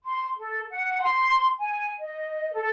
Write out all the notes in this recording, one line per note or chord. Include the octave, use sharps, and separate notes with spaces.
C6
A4
F#5
C6
G#5
D#5
A4